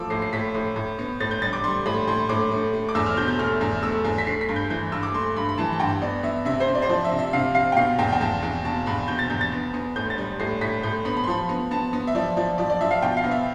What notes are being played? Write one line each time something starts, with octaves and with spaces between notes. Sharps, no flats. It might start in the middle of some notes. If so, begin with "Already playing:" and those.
Already playing: F3 A3 D6 E6
A2 C7
C7
A2 B6
A2
A2
B3
A2 A6
G6
G3 A6
D6
G3 C6
A2 B5
A2 C6
A2 D6
A3
A3
D6
E2 E6
F6
B2 G6
G6
A3 F6
E2
A3 E6
E2
B6
A3 C7
B6
G2
G6
E3 G6
G2 E6
D6
A3 C6
G2 B5
B5
E3 A5
A5
G2 G5
B3 D5
B3 E5
C3 E5
C5
C3
D5
C5
F3 D5
E5
C3
E5
C3 F5
C3 F5
G5
B2 F5
E2 G5
G5
E2 A5
E2
B2 A5
E2 B5
B2 G6
A6
E2 G6
A6
B3
B3
A2 G6
A6
G3
A2 C7
A2 B6
A2 G6
B3 B5
B5
C6
F3 B5
B3
B3 A5
B3
E5
F3 D5
F3 D5
F3 D5
D5
F3 E5
F5
B2 G5
F5
B3
E5